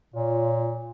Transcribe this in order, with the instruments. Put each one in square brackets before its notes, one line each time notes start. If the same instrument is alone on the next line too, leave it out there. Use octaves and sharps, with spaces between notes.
[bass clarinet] A#2 [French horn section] F4 C#5